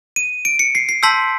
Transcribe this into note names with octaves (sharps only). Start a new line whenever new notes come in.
D#7
D7
C#7
C7
C7
A5 C6 E6 G6 B6